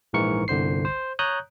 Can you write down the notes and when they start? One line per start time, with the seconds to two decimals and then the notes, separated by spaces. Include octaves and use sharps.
0.13 A#1 G#2 E3 A#4 C#6 C#7
0.48 G1 C2 D3 C5 C7
0.85 C5
1.19 C#5 A#5 D#6 F#6 G6